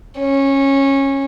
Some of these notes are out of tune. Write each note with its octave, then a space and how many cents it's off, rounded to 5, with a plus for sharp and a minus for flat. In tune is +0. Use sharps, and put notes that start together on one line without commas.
C#4 -15